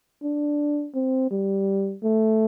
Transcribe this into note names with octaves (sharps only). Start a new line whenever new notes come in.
D4
C4
G3
A3